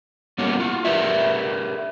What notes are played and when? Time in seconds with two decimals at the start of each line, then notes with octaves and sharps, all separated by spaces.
0.38 G3 A#3 B3 C#4 F#4
0.60 F4 F#4
0.85 G4 A#4 B4 D5 E5